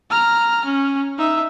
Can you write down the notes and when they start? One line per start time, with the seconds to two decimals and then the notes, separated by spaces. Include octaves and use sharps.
0.10 A#5 F6
0.65 C#4
1.18 D#4 E5